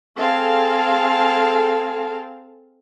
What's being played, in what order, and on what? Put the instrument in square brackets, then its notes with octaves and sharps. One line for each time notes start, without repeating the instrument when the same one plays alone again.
[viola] C4 A5 [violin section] G#4 A4 F5